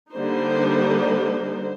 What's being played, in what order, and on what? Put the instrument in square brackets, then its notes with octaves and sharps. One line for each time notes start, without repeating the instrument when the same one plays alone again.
[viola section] D3 G3 A#3 D#4 C5